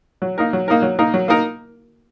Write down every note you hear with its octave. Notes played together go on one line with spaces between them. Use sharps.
F#3
A#3 D#4 A#4
F#3
A#3 D#4 A#4
F#3
A#3 D#4 A#4
F#3
A#3 D#4 A#4